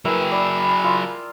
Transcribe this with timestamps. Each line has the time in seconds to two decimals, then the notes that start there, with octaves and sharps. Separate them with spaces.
0.05 F#3 E4 G#4 A#4 B4 G5
0.31 D5 B5
0.84 F4